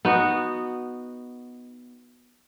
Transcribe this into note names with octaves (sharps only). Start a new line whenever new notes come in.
B3 D#4 F#4